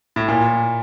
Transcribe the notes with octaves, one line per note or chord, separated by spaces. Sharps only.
A2
A#2